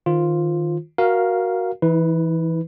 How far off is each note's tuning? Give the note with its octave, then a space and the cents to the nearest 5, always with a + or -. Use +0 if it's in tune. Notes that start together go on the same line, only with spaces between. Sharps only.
D#3 -5 F4 +0 C5 +0
F#4 +0 A#4 +10 F5 -5
E3 +0 E4 -45 B4 +5